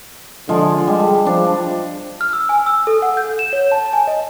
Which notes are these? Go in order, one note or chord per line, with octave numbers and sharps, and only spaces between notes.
D3 F3 G#3
G3 G#3
F3 D4
F6
E6
G#5
E6
A4
F#5
G6
E7
C#5
A5
G#5
D#5